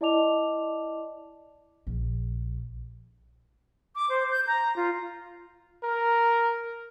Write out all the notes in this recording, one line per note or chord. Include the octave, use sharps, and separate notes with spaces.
E4 D5 D#5 A5 D6 F7
A#1
D6
C5
G6
A#5
F4
A#4